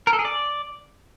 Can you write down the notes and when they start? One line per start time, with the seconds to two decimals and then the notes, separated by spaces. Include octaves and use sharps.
0.07 A#4
0.13 A4
0.19 G#4
0.25 D5